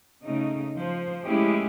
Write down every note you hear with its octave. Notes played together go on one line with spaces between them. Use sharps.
C#3 A3 D#4
F3 C5
G#3 A3 C#4 E4 G4 G#4